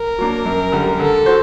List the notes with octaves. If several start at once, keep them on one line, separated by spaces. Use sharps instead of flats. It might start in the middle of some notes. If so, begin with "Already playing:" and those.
Already playing: A#4
F#3 A#3 D4
F#2
D3 G3
D3 A4
F#4 C5